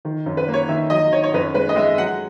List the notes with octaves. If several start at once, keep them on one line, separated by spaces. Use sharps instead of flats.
D#3
F#2
B4
A#3
C#5
D#3 E5
F#3 D#5
D#3 C#5
C#5
F#2 B4
G#3 B4
D#5
G#3 E5
F#3 F#5